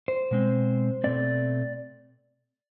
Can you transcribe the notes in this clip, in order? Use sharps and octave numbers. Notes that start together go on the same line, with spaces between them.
C5
B2 G#3 C4
B2 A3 C4 D5